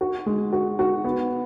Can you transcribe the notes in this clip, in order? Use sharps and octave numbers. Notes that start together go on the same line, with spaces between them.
F#4
G#3
F#4
F#4
B3